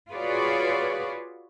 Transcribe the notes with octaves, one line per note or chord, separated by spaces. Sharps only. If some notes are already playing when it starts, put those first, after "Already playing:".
F4 F#4 G#4 B4 C#5 D5